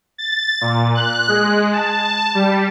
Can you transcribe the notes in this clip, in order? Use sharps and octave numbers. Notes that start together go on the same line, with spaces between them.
A6
A#2
F#6
G#3
A5
G3